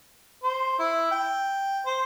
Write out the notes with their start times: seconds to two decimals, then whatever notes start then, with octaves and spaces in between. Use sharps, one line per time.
0.43 C5
0.79 E4
1.11 G5
1.86 C5